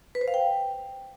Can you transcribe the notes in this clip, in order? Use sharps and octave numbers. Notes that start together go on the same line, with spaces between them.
B4
C5
F5
G5